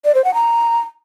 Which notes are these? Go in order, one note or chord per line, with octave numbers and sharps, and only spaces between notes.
D5
C5
F#5
A#5